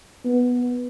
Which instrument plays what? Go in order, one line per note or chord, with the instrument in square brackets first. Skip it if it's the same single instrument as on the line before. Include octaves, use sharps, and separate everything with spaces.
[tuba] B3